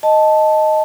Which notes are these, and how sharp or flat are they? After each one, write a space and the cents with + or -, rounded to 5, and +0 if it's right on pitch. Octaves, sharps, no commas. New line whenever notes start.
D#5 +0 A5 -5